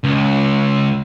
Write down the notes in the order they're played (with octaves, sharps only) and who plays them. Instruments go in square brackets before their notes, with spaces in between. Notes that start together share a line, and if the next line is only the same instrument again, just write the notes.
[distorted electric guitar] C#2